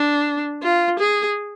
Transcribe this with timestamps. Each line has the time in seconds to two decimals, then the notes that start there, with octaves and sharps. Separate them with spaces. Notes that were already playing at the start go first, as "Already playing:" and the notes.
Already playing: D4
0.62 F4
0.99 G#4